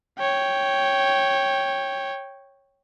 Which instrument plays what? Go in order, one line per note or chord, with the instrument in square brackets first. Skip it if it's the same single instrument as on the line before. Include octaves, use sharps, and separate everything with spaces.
[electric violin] C#5 G5